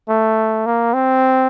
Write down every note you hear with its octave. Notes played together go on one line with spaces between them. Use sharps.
A3
A#3
C4